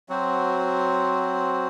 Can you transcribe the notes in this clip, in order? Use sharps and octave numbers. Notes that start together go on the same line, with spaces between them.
F#3 C4 F#4 C5